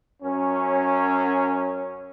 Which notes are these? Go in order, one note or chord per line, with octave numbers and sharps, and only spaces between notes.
F#2 C#4